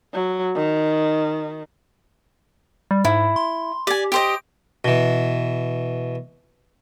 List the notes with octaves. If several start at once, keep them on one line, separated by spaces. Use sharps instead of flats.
F#3
D#3
G3
G#2 E4
C6
G4 D5 G#5
G4 C5 D#5 D7
B2 E3